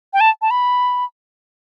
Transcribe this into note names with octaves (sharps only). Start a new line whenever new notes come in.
G5
A5
A5
B5